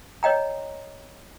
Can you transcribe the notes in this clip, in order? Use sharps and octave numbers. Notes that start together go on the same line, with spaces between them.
C#5 D#5 G5 A#5